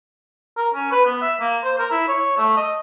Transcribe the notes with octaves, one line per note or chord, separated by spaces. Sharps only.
A#4
C#4
B4
B3
E5
A#3
C5
A#4
E4
C#5
A3
D#5